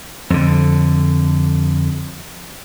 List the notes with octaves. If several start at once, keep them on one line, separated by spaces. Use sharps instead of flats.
F2 D3